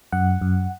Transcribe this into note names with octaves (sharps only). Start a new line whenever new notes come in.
F#2 F#5
F#2